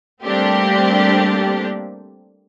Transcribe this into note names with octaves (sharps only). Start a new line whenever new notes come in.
G3 A3 A#3 C4 D4 G4